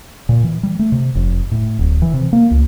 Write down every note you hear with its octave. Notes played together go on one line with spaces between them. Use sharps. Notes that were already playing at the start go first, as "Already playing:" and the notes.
A#2
E3
G3
A3
C3
F1
A2
D1
E3
C3
A#3
C#2